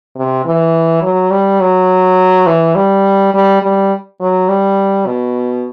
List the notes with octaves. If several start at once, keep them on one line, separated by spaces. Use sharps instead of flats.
C3
E3
F#3
G3
F#3
E3
G3
G3
G3
F#3
G3
B2